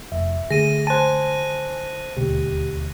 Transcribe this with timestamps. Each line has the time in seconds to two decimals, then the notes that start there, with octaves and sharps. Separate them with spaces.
0.12 F1 E5
0.51 D3 A3 G#4 A#6 D#7
0.87 C5 G#5 A5 F#6 D#7
2.17 D#1 D2 B2 G4